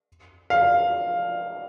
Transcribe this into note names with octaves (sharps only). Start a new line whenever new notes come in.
F5